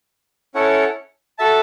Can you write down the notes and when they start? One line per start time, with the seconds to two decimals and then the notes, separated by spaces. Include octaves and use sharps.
0.55 C#4 E4 A4 C#5 F#5
1.38 F#4 A4 E5 A5